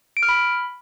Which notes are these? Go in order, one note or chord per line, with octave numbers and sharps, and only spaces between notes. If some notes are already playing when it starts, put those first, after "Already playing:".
D7
F6
B5